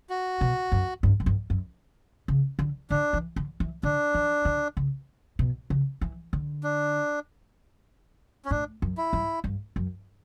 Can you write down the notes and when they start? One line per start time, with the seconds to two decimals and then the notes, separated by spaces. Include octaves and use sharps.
0.10 F#4
0.41 B2
0.72 F#2
1.03 G2
1.20 F#2
1.26 G2
1.50 F#2
2.28 C#3
2.59 D3
2.90 D3 D4
3.13 E3
3.36 D3
3.60 E3
3.83 D3 D4
4.14 E3
4.45 D3
4.77 C#3
5.39 B2
5.70 C#3
6.01 E3
6.33 D3
6.63 D4
8.45 C#4
8.50 A2 D4
8.82 F#2
8.97 E4
9.13 G2
9.44 G2
9.76 F#2